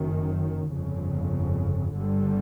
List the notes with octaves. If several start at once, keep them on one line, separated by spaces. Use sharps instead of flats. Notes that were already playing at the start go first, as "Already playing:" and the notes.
Already playing: F#1 F#2 D#3
G1 F2 C#3
G1 G2 D3 G3